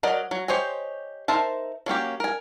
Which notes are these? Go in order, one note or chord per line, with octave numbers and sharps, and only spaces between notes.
F#3 A#4 D5 D#5 F#5
F#3
G4 C5 C#5 D#5 G#5
D#4 A#4 C5 E5 A5
F#3 A#3 C#4 G4
A#4 G#5